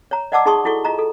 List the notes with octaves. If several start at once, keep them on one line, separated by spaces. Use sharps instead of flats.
C#5 A#5
D5 D#5 F#5 A5 D6 E6
D#4 G#4 A5 C6 C#6 D#6
E4 F#4 A4 C#6
F4 D#5 A#5
A4